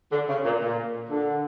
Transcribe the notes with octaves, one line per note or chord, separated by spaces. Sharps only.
D3
C#3
A#2
A#2
D3